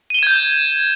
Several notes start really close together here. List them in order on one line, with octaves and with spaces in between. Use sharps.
D#7 G7 E7 G#6 G6